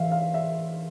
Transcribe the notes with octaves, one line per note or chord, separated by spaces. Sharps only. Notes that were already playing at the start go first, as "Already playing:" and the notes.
Already playing: E3 E5 F5
F5
E5